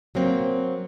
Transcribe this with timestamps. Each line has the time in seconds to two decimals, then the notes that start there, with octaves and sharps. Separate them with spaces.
0.15 F#3 A#3 C4